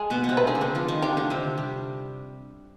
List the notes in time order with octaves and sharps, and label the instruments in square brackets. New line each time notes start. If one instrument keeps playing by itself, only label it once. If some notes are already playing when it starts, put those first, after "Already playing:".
Already playing: [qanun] G#3 [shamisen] G#4
[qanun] B2 B3
B3
C3 C4
[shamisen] B4
[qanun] D3 D4 [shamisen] G#4
[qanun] C4
D3 D4
F3 F4
D#3 D#4
[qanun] D3 D4 [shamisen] G4
[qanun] D3 D4
C3 C4
G3